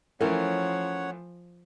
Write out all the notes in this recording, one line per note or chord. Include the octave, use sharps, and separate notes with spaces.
E3 F3 A3 C#4 E4 A#4 C#5 F#5